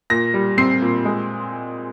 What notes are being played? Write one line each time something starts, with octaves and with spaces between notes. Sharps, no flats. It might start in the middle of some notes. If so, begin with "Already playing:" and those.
A#2 A#6
G3
C4 C7
A#2
G#3